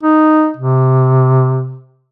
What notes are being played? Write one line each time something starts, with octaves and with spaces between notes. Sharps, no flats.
D#4
C3